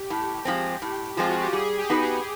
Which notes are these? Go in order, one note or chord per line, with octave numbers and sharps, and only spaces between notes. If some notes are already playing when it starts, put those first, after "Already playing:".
Already playing: G4
A2
F3 G#3 C4
A2
F3 G#3 C4 F4
F#4
G4
G3 G#4
G4
B3 D#4 F#4 B4
G#4